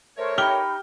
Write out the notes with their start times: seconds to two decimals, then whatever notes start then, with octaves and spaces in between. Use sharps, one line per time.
0.17 A3 A#4 C5 C#5 C#6
0.38 D#4 G4 B5 F6 G7